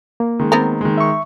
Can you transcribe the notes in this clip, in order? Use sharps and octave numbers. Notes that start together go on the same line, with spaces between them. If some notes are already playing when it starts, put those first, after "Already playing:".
A#3
D#3 G#3
B3 C4 A#4
D#3 G#3
E5 C#6